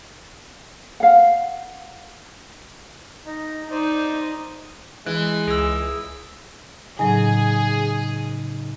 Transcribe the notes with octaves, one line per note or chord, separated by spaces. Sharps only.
F5 F#5
D#4
D#4 C5 D5
E3 G#3 F#6
C#2 G#4 E6
A2 C#3 F#3 D#4 G#4 D#5 G#5